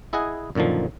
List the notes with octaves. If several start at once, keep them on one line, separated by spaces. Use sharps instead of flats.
E4 G#4 D#5 F#5 G#5
F#2 A#2 D3 D#3 F3